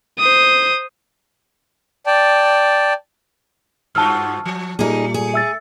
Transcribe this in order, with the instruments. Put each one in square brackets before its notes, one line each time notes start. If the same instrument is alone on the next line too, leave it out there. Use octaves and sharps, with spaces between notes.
[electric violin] C5 D#6
[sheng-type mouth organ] D5 G5 A5
[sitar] G2 F4 F#4 [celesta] A5 E6 F6
[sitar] F3
[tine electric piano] A#2 G3 [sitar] A3 [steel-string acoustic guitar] D#4 G#4
[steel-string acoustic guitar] G#4
[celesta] E5 E6 A6